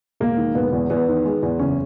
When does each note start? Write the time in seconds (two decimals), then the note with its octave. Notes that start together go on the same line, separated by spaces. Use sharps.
0.20 E1 A#3
0.37 D#3
0.55 E1 B3
0.73 E2
0.90 E2 B3
1.08 D#3
1.26 G#3
1.43 E2
1.59 F#1 C#4